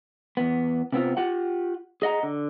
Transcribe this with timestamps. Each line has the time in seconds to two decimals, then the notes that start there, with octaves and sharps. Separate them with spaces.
0.37 E2 B3
0.92 C3 B3 C4 F4
1.17 F4 G4 F#5
2.02 G#4 D#5 F#5 A#5
2.23 D3